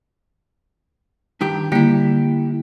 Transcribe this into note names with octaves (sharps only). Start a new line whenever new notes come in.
G2 D#3 G4
D3 G3 A#3 E4 G4